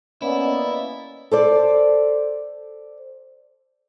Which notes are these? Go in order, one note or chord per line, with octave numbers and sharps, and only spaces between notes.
A#3 B3 C#4 E4 D5 D#5
A4 C5 D5